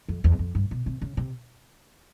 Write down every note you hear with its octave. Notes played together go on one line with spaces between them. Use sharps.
F2
E2
F2
G2
B2
C3
C#3
C3